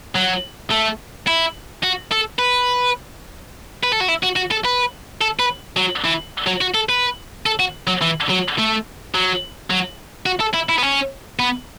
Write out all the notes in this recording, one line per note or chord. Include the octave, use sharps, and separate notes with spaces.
F#3
A3
E4
F#4
A4
B4
B4
A4
F#4
E4
F#4
F#4
A4
B4
A4
B4
F#3
E3
F#3
F#4
A4
B4
A4
F#4
F#3
E3
F#3
A3
F#3
F#3
F#4
A4
E4
E4
B3
C#4
B3